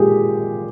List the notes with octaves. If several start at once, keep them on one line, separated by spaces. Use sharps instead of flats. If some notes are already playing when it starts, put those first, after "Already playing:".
Already playing: A#2 G#3 G4 G#4